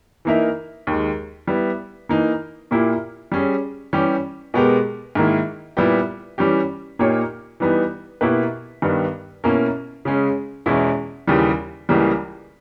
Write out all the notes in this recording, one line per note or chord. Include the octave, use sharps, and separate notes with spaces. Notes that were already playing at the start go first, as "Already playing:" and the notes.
E3 A#3 D#4 A#4 E5
D#2 D#3 G#3
G3 B3 E4
E3 A#3 D#4
A#2 A#3 E4 G4
G3 C#4 G#4
E3 G3 C#4 G4
B2 G#3 B3 G4 A#4
G#2 D#3 A#3 E4
A#2 G3 B3 E4 G4
E3 G3 C#4 G4
A#2 A#3 D#4 G4 C#5
E3 G3 B3 D#4
B2 A#3 E4 G4 B4
G2 D#3 G3 B3
B2 A#3 C#4 E4 A#4
C#3 G#3 C#4 G#4
E2 B2 G#3 C#4 E4
D#2 C#3 E3 G3
C#2 C#3 E3 G3 A#3